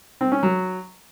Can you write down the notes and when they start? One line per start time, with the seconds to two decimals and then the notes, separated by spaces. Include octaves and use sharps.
0.21 C4
0.32 C#4
0.43 F#3